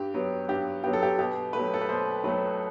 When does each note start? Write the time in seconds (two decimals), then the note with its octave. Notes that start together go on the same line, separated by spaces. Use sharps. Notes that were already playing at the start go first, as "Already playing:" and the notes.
Already playing: G2 G4
0.14 F#3 B3
0.48 G2 G4
0.84 F#3 B3 G4
0.93 A4
1.03 G4
1.19 B2 G4
1.53 F#3 A3 B4
1.74 A4
1.82 B4
1.89 B2 C5
2.24 F#3 A3 B4